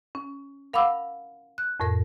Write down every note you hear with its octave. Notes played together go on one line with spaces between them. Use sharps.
C#4
A#4 F5 F#5 B5 D6 E6
F#6
F2 A2 A#4 A#6